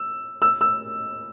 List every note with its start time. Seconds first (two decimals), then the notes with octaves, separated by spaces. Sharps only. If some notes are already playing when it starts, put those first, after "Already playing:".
Already playing: E6
0.42 E6
0.61 E6